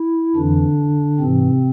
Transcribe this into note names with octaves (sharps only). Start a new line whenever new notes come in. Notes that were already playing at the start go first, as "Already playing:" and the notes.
Already playing: E4
F2 D3 E3 D4
G#2 C3 E3 C4